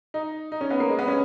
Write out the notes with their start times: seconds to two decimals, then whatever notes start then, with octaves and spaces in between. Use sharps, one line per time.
0.14 D#4
0.52 D#4
0.61 C#4
0.70 B3
0.80 A#3
0.89 G#3
0.99 B3
1.08 C#4